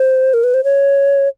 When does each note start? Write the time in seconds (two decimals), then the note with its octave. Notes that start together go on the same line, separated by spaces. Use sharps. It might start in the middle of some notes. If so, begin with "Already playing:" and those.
Already playing: C5
0.34 A#4
0.44 B4
0.54 C5
0.64 C#5